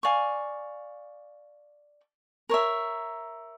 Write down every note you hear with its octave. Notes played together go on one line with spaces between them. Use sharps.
D5 F5 G#5 C#6
A#4 C#5 E5